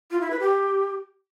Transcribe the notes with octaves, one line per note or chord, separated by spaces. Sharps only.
F4
E4
B4
G4